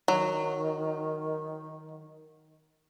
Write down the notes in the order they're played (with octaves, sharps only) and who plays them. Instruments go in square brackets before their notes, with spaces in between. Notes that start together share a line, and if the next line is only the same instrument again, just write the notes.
[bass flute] D#3 [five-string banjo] F#3